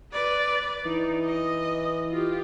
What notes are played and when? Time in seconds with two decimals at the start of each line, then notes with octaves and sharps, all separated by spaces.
0.12 B4 D5
0.86 E3 D#4
1.25 D#5
2.11 F4 G4